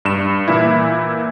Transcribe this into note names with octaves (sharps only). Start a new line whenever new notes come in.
G2 E7
A#2 E3 E4